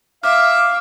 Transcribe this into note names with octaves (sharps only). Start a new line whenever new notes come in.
E5 F5 D6 F6